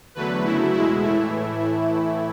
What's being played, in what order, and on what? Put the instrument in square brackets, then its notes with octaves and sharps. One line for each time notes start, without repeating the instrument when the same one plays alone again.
[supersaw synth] E2 D3 F#3 A3 B4
F#2 C#3 F#3 A3 E4
E2 B2 G#3 E4
A2 E3 A3 E4